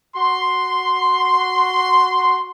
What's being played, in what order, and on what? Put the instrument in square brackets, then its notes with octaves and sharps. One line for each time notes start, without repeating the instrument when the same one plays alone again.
[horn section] F#4 C6